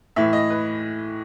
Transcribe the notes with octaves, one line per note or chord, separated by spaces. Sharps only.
A2 E3 E5
D#5
B4